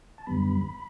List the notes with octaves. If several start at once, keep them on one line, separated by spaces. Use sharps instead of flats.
A5
F#2 D3 G3 B3 B5